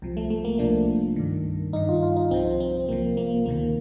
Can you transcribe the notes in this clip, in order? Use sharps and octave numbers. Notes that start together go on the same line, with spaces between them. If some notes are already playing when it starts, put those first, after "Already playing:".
C2 C3 F3
A3
A3
A#3
C2 C3 F3 D4
G2 D#3
G2 D#3 D#4
F4
F4
D#4
C2 C3 F3 C4
C4
C2 C3 F3 A#3
A#3
D2 C3 D#3 A#3